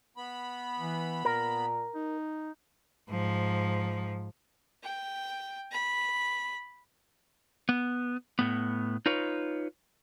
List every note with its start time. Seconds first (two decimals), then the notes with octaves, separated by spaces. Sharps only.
0.17 B3 B5
0.79 E3
1.25 A#2 A#4
1.95 D#4
3.10 G#2 F3
4.83 G5
5.71 B5
7.69 B3
8.39 A2 B3
9.06 D#4 F4 B4 C#5